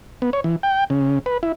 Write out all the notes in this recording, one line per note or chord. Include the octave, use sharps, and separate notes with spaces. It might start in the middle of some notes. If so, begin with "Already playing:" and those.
B3
C#5
E3
G5
C#3
B4
E4